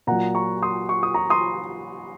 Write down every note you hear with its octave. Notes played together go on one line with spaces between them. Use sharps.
A#2 F#3 F#5 A#5
A#5 C#6
C6 D#6
C#6
D#6
A#5 C#6
C6 D#6